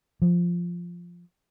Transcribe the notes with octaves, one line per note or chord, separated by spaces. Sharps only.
F3